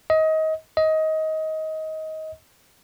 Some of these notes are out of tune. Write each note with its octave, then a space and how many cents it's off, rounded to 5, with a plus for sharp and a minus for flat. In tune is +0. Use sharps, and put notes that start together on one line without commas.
D#5 +25
D#5 +20